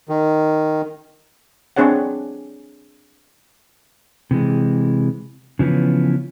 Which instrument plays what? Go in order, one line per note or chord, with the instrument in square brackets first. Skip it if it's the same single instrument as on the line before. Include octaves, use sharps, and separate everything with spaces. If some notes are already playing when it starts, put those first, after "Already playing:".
[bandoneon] D#3
[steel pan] C4 D4 G#4 C#5 F#5
[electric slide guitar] C3 E3 G#3
C#3 E3 F3 B3 C#4